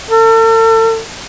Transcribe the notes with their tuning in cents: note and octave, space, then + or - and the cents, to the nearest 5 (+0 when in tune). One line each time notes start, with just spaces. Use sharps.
A4 +40